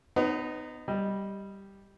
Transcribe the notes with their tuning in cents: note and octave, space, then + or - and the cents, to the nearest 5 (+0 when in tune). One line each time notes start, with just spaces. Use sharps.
B3 +30 D#4 -15 C#5 +0
G3 +0 D#5 +0